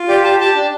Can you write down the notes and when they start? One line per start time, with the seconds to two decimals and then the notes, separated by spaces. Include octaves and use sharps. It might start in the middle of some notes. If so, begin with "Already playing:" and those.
Already playing: F4
0.08 G4 D5
0.24 G4 A5
0.40 G4 A5
0.55 D4